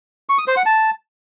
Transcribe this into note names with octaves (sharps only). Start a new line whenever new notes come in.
C#6
D#6
C5
F#5
A5